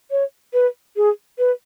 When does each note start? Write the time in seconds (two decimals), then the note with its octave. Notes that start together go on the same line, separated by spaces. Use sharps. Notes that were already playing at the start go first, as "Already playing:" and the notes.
0.11 C#5
0.53 B4
0.96 G#4
1.38 B4